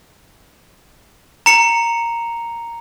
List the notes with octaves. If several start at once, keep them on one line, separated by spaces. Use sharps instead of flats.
A#5 C#7 F7